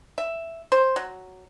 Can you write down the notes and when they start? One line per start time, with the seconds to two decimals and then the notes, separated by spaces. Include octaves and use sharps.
0.18 E5
0.72 C5
0.96 F#3